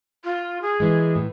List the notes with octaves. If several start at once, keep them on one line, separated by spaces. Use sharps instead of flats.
F4
G#4
E3 G#3
A2